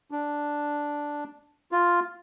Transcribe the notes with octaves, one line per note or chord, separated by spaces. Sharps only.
D4
F4